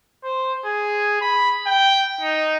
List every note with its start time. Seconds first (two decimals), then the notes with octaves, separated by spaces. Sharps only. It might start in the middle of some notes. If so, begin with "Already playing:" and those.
0.24 C5
0.65 G#4
1.21 B5
1.66 G5
2.21 D#4